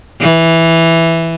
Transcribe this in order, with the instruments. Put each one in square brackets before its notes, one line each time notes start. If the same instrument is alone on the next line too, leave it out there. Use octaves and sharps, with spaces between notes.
[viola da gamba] E3